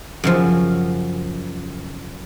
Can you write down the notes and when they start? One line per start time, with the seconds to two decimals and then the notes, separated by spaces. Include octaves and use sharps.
0.24 F#2 C#3 F3